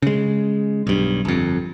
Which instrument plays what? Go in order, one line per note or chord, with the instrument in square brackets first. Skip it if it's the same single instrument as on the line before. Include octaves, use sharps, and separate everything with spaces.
[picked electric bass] C#3 G#3
B1 G2
G1 F2